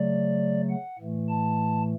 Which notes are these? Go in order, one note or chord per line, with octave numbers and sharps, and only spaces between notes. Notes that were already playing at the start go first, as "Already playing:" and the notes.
Already playing: C#3 F#3 A3 D5
F#5
A2 E3 A3
A5